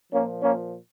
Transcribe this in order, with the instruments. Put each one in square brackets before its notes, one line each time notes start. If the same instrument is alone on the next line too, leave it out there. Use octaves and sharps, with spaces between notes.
[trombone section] A#2 F3 A#3 C#4
A#3 C#4